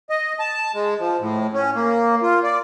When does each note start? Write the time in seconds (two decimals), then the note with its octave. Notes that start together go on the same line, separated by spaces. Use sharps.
0.10 D#5
0.40 A5
0.74 G#3
1.00 F3
1.20 A2
1.53 C#4
1.75 A#3
2.22 F4
2.44 D5